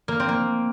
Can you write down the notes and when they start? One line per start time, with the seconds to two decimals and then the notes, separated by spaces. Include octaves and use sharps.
0.08 A#3
0.20 C4
0.29 A#3